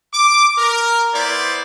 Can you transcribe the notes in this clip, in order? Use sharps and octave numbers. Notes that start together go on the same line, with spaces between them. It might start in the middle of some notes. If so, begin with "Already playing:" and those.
D6
A#4
B3 E4 C5 D5